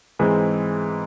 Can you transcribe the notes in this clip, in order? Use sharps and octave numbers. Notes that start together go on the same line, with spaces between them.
G#2 E3 G#3 C4